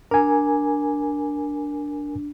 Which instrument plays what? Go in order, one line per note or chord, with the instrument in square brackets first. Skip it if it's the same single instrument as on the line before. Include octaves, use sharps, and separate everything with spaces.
[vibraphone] D4 [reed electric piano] A#4 G#5